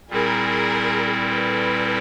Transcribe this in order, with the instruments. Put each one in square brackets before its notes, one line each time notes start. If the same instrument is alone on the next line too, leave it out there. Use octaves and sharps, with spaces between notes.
[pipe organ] A#2 G3 C4 E4 [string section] G#4 A#4
[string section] A4 B4